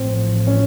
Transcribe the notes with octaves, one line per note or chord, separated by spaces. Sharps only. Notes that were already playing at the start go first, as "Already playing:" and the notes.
Already playing: A1 A2 F3 C4
C#4